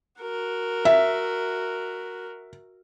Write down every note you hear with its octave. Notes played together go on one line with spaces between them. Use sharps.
F#4 A#4
E5